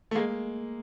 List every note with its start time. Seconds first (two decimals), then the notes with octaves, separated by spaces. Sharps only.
0.11 A3
0.15 G#3 A#3